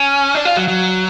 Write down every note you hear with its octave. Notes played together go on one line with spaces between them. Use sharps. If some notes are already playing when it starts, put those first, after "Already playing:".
Already playing: C#4
D4
F4
F#3
F#3